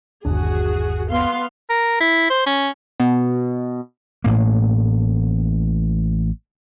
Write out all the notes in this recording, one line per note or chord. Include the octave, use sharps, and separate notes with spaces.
G1 D#2 D4 F#4 G#4
B3 F5 C6
A#4
E4
C5
C#4
B2
A1 A2 A#3